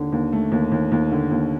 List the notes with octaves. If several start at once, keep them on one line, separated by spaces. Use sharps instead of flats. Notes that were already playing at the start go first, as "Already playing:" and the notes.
Already playing: D#2 D3
D#2
A3
D#2
D#2
D#2
D3
D#2